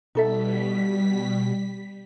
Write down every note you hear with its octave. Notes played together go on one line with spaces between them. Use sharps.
B2 G3 D#4 A4 E5 B6